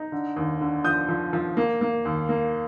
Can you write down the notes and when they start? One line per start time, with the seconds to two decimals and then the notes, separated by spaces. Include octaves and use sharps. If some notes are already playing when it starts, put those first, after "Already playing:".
Already playing: D#4
0.12 D3
0.36 D#2
0.61 D3
0.84 F3 D#6 G6
1.09 F3
1.33 F3
1.57 A#3
1.81 A#3
2.05 D#2
2.29 A#3